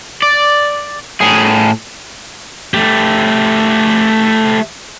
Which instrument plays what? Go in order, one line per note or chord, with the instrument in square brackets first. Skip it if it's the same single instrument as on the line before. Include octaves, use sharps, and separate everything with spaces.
[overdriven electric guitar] D5
A2 G#4
[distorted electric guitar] A3 G4